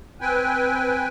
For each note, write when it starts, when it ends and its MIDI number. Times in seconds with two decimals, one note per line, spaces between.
0.21 1.08 60
0.21 1.08 71
0.21 1.08 79
0.21 1.08 80